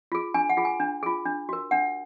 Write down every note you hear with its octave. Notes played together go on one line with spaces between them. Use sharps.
F4 G#4
D4 G#5
F#5
F4 G#4
G#5
D4
F4 G#4
D4
F#4 A#4
D4 F#5